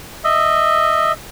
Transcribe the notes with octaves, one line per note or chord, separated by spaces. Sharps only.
D#5 E5